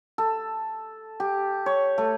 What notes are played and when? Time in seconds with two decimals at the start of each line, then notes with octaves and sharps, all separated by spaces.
0.18 A4
1.20 G4
1.66 C#5
1.98 A3